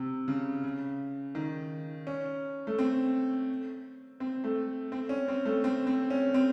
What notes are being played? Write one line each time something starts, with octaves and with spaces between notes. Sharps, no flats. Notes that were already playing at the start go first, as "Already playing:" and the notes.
Already playing: C3
C#3
C#3
D#3
C#4
A3
C4
C4
A3
C4
C#4
C4
A3
C4
C4
C#4
C4